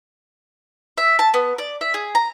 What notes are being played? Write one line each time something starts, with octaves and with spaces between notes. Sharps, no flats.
E5
A5
B3
D5
E5
G#4
A#5